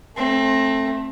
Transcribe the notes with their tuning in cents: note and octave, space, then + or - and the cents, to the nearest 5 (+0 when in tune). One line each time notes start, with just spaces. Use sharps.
A3 +0 C4 +30